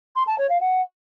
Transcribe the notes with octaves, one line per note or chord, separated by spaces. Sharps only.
C6
A5
C#5
F5
F#5